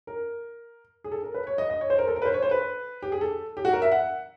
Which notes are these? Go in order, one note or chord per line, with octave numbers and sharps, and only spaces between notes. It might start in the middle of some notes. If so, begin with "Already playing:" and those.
A#4
G#4
A4
A#4
B4
C#5
D#5
D#5
C#5
C5
A#4
A4
A#4
B4
C5
C#5
C5
B4
G4
G#4
A4
G4
F#4
A#4
E5
F#5